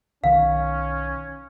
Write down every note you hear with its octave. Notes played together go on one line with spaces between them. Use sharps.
B1 D#3 C#4 F5